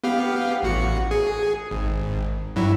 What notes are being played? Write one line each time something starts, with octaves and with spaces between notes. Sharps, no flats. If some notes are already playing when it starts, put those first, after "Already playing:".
B3 G4 F5
A1 F#4 C#7
G#4
G#1
G2 F#3 E4